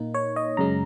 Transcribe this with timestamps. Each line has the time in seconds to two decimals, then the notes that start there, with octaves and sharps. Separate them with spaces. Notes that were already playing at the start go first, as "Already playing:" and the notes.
Already playing: A#2 A#3 D#4
0.14 C#5
0.36 D#5
0.57 F#2 C#3 G#3 C#4 A#5